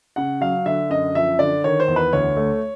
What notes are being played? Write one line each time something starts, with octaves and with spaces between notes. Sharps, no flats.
C#3 F#5
F#3 F5
D3 E5
F#2 D#5
F3 E5
D3 D5
D#3 C#5
C5
E2
B4
D2 C#5
A3